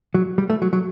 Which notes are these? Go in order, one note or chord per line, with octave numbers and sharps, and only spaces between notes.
F#3
G3
A3
F#3
F#3